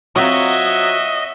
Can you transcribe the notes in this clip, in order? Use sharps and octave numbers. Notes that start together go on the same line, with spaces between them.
F#3 C4 F4 F#4 D#5 E5